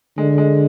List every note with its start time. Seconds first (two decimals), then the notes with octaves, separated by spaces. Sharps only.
0.18 D3 G#3
0.38 G#3